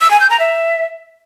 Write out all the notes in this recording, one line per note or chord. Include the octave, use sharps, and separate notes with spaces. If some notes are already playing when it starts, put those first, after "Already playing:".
E6
G#5
G6
A#5
E5